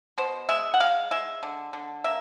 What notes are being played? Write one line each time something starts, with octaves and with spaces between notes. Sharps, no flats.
B2 C5
G#3 E5
F#5
G#3 F5
G#3 E5
D3
D3
A#3 E5